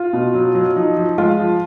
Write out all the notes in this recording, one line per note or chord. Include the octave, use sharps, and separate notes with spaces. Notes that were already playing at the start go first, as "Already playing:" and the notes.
Already playing: F4
B2
F#3
F#3
F3 D#4
F3
G#3 F4
F3